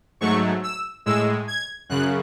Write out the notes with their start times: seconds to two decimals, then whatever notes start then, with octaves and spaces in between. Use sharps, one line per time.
0.21 G#2 F#3 A3 C#6
0.63 E6
1.06 A2 G#3 E6
1.48 G#6
1.89 F#2 C#3 F#6